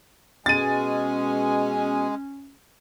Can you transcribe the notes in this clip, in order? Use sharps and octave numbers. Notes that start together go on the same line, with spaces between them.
B2 G#3 C#4 G#5 A6 D#7